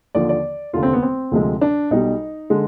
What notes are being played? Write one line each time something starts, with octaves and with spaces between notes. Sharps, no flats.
D#2 D3 F3 D5
D5
F1 D#2 D3 F4
C4
B3
C4
D2 C3 F3 G#3
D4
B1 B2 G3 D#4
D3 G#3